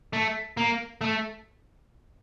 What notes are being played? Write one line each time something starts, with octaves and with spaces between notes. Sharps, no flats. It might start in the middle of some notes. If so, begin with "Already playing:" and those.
A3
A#3
A3